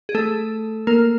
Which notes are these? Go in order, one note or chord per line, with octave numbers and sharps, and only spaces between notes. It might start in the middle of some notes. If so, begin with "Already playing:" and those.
G#4
A3 A4
A#3 A#4